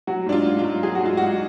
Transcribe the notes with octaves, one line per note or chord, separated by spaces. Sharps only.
F#3 F#4
G#2 D4
F4
G#2
F4
F#3
F#3 G#4
F#4
G#2 F4
G#2 F#4